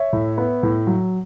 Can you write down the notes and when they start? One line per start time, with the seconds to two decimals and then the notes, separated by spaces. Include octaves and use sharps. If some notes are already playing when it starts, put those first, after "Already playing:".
Already playing: C#5 E5
0.13 A2
0.38 B3
0.63 A2
0.87 F#3